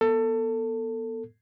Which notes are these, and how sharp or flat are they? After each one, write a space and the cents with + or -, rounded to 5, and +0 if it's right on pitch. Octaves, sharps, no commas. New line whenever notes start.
B3 -30 A4 +25